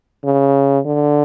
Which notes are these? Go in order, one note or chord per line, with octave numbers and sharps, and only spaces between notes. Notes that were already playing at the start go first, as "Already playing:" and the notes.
C#3
D3